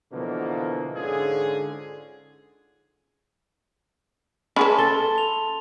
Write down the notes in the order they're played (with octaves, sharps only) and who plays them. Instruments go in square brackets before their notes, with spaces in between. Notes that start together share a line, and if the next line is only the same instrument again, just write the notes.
[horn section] B2 D3 E3 F3 A3 A#3
G#2 D3 C#4 F4 G#4
[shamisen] C#4 G#4 B4 [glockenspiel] A5 C6 [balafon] B5
[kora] A4 [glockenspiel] G7
[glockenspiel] F7